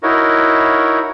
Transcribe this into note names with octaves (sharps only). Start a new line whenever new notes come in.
D#4 E4 F#4 A#4 C#5